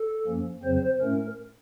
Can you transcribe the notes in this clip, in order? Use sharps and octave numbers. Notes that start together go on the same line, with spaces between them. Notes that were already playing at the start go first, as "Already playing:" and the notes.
Already playing: A4
F#2 F3 A#3 C#4
F2 C#3 F#3 C4 C5
A2 A3 C#4 A#4